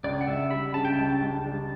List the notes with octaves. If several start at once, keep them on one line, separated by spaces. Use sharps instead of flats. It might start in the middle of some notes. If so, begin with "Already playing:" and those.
C#2 D5
F#5
C#2 E5
G3 B5
C#3 A5
G5
C#2 A5
C#2
G3